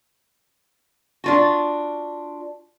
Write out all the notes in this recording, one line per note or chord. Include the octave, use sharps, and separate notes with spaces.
D4 F4 F#4